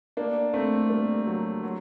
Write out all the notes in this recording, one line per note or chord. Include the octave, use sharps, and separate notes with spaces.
A#3 D4
A3 C4
G3 A#3
F#3
F#3